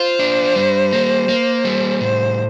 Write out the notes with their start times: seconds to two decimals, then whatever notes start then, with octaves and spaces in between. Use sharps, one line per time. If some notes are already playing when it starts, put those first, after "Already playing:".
Already playing: F4 C5
0.19 D4
0.55 G3
0.93 A#3
1.29 A#3
1.65 G3
2.00 A2 C5